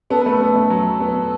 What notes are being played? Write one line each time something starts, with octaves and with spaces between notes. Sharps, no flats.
B3 A4
A3 B4
A4
B3
A3
F#3
B3